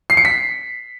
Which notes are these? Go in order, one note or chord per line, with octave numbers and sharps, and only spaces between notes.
C7
C#7
B6